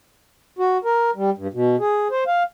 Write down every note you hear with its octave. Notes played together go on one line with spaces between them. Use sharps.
F#4
A#4
G3
G2
B2
G#4
C5
F5